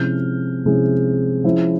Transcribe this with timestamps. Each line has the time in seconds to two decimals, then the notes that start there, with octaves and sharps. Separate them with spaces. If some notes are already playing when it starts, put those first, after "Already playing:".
Already playing: C3 F3 G#3 C#4 E4 F6 G6
0.65 C3 F3 G#3 C#4 E4
1.44 F3 G#3 C#4 E4